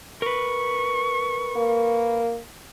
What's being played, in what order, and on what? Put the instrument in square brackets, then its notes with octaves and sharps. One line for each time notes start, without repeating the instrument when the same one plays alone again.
[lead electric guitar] A#4 B4 [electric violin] C#6
[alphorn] A#3